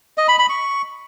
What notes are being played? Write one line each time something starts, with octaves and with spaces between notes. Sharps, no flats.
D#5
B5
B5
C#6